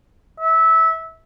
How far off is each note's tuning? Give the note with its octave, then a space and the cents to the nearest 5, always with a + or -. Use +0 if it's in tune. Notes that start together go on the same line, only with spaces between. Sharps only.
E5 -20